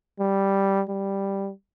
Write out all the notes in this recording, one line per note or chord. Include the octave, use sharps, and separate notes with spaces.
G3
G3